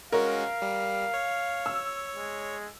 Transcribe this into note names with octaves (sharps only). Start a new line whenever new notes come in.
G#3 C#4 F#4 A#4 F5
G3
C#5
E6
G#3